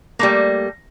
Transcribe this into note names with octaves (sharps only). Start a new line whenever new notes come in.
G3 A3 A#3